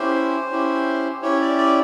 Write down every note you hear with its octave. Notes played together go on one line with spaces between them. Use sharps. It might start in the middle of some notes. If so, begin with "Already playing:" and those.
Already playing: C#4 E4 G4 C5
C#4 E4 G4
C#4 E4 G4 C#5
D5
D5